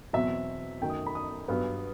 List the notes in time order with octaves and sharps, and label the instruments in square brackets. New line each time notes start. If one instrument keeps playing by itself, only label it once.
[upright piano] E2 B2 F#3 C4 E5
F#2 D#3 A3 G5
D#6
B5
D#6
G2 F#3 B3